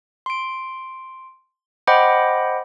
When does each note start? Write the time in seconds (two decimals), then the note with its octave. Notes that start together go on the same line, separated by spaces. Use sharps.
0.26 C6 D7
1.87 C5 D#5 F#5 G5 B5 D6